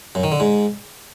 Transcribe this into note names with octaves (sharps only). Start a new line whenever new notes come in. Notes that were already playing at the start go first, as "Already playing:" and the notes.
F#2
D#3
D3
G#2